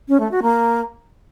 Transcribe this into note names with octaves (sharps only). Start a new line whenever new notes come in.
C#4
A3
F#4
A#3